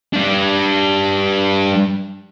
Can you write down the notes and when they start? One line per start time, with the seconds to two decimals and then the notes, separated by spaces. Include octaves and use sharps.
0.13 G3 D4